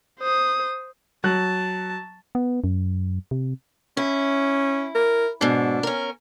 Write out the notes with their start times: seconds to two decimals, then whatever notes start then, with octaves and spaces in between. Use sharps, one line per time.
0.20 C5 D#6
1.24 F#3 A5 F#6
2.35 B3
2.64 F#2
3.31 C3
3.97 C#4 E4
4.95 A#4
5.41 G#2 B2 D4
5.83 C#4 A#4